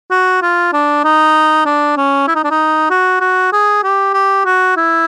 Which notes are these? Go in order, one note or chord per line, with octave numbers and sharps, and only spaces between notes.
F#4
F4
D4
D#4
D4
C#4
E4
D#4
D4
D#4
F#4
F#4
G#4
G4
G4
F#4
E4